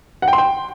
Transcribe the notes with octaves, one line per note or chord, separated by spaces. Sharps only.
F#5
G5
C6
G5